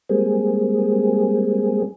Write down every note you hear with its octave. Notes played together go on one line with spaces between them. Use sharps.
G3 G#3 A#3 C4 G#4